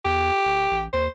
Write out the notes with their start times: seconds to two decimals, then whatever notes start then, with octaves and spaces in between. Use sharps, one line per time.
0.05 E2 G4
0.45 D1
0.71 A1
0.93 D#2 C5